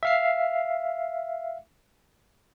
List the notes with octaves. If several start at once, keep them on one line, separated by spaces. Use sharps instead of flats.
E5 F5 C7